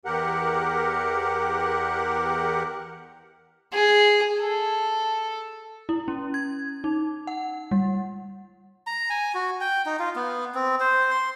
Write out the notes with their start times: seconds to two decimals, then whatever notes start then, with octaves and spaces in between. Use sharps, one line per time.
0.05 E2 G4 A#4 F#5
3.72 G#4
4.40 A4
5.89 E4
6.08 C#4
6.34 G#6
6.84 D#4
7.27 F#5
7.71 G3
8.87 A#5
9.10 G#5
9.34 F#4
9.61 G5
9.86 D#4
9.99 F4
10.16 B3
10.55 C4
10.80 C5
11.11 C6